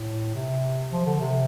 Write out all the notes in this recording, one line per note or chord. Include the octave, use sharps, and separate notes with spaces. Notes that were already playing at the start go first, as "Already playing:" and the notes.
Already playing: A2
C3
F3
D3
C3